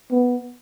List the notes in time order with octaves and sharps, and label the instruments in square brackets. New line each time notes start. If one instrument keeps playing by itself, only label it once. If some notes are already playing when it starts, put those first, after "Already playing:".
[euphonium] B3